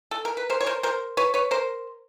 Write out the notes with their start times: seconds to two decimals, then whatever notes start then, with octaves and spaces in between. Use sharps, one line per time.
0.11 A4
0.25 A#4
0.37 B4
0.50 A#4 C5
0.61 C#5
0.66 A#4 C5
0.83 A#4 C5
1.17 B4 C#5
1.34 B4 C#5
1.51 A#4 C5